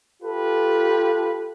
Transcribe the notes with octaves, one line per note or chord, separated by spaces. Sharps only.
F4 G4 A4 B4